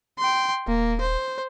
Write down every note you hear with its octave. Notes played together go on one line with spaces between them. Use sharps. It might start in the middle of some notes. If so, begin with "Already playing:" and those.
G5 C6
D#1 A#3
C5